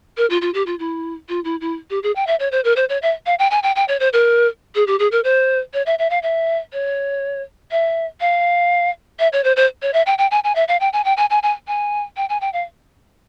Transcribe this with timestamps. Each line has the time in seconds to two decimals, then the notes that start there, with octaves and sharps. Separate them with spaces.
0.17 A#4
0.30 F4
0.42 F4
0.54 G4
0.66 F4
0.79 E4
1.29 F4
1.44 E4
1.61 E4
1.90 G4
2.03 G#4
2.16 G5
2.27 E5
2.40 C#5
2.52 C5
2.64 A#4
2.76 C5
2.89 C#5
3.02 E5
3.26 F5
3.39 G5
3.51 G#5
3.63 G5
3.76 G5
3.88 C#5
4.00 C5
4.13 A#4
4.75 G#4
4.87 G4
4.99 G#4
5.12 A#4
5.24 C5
5.74 C#5
5.86 E5
5.99 E5
6.10 F5
6.23 E5
6.73 C#5
7.71 E5
8.21 F5
9.19 E5
9.33 C#5
9.44 C5
9.56 C5
9.82 C#5
9.94 E5
10.06 G5
10.18 G5
10.31 G#5
10.44 G#5
10.55 E5
10.68 F5
10.80 G5
10.93 G#5
11.05 G5
11.17 G#5
11.30 G#5
11.43 G#5
11.68 G#5
12.17 G5
12.29 G#5
12.41 G5
12.53 F5